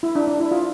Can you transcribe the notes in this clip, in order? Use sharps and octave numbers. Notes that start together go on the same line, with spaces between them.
E4
D4
D4
E4
F4